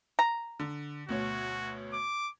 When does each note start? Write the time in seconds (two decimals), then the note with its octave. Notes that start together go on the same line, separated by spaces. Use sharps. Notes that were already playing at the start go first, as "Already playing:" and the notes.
0.19 A#5
0.60 D3
1.09 D2 B2 F#4 C#5
1.93 D6